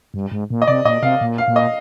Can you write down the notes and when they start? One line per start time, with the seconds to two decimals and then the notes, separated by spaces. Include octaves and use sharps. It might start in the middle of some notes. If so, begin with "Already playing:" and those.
0.14 G2
0.32 G#2
0.50 A#2
0.62 D#5
0.67 C3 D5
0.85 A#2 D#5
1.02 C3 F5
1.21 A#2
1.38 F5
1.48 A#2
1.56 D#5